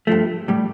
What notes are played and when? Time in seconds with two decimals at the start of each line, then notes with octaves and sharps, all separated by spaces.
0.07 G2 F3 A3
0.48 A2 G3